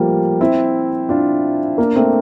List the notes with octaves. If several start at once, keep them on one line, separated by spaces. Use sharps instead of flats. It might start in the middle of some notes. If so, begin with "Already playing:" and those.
Already playing: F3 G3 A3 A#3
C4 E4
D4 F4
A#3 D4
A3 C4